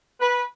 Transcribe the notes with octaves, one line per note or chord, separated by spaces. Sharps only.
B4